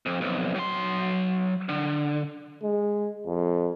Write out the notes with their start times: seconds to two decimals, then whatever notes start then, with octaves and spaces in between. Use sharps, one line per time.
0.06 F2
0.21 B1 F2
0.56 F#3 C6
1.69 D3
2.63 G#3
3.26 F2